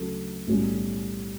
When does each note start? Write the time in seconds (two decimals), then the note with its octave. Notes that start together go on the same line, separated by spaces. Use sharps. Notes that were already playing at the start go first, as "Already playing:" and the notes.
Already playing: D2 C#3 F#3 A3 A4
0.47 B1 A2 G3 C#4